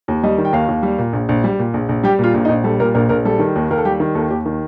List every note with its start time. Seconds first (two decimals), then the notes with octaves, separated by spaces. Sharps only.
0.08 D#2
0.24 G3 D#5
0.38 D#3
0.45 G5
0.53 D#2 F5
0.68 D#2
0.83 G3
0.99 A#2
1.13 A#1
1.29 A#1
1.44 G3
1.59 A#2
1.74 A#1
1.89 A#1
2.04 G3 G4
2.19 A#2 F4
2.34 A#1
2.45 D#4
2.49 A#1
2.64 G3 A4
2.80 A#2 A#4
2.95 A#1 A#4
3.09 A#1 A#4
3.25 G3 A4
3.39 D#3
3.56 D#2
3.70 D#2 A#4
3.77 A4
3.85 G3 G4
4.00 D#3
4.15 D#2 A4
4.30 D#2 G4
4.46 D#3